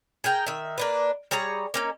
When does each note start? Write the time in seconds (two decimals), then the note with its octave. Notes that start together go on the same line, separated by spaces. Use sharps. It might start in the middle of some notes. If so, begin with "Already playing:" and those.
0.24 G#4 A#4 G5 A#5
0.46 D#3 E5
0.78 A#3 D4 B4
1.31 G3 G#4 C#5 A#5
1.74 A#3 C#4 D#4